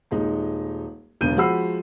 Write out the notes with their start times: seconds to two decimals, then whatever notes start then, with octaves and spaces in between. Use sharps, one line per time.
0.11 D#1 G#3 D#4
1.21 E1 B1 D3 G6 D#7
1.37 F3 G#3 F#4 B5 E6 C7